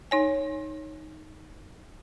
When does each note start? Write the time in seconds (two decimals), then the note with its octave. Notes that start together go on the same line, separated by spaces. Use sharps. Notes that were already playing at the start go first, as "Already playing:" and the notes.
0.11 D#4 C#5 G#5